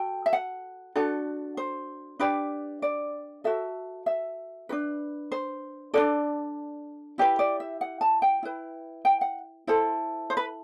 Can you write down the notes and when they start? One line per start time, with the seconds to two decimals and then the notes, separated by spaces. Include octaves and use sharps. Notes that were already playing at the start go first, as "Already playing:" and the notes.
Already playing: F#4 A4 G5
0.26 E5
0.33 F#5
0.96 D4 F#4 A4
1.57 C5
2.19 D4 G4 B4 D5
2.82 D5
3.44 F#4 A4 E5
4.06 E5
4.69 D4 F#4 B4
5.32 C5
5.94 D4 F#4 A4 D5
7.18 E4 G4 B4 D5
7.39 D5
7.60 E5
7.81 F#5
8.01 A5
8.22 G5
8.43 E4 B4
9.05 G5
9.21 F#5
9.67 E4 A4 C5
10.30 C5
10.37 B4